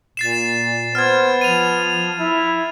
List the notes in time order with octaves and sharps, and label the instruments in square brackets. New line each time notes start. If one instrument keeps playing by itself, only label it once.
[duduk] A#2 [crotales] A6 C7 E7
[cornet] B3 [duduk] C5 [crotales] F6 G#6
[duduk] F3 [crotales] D#7 F7
[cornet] E4